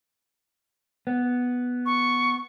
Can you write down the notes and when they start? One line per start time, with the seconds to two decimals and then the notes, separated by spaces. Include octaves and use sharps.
1.07 B3
1.86 C#6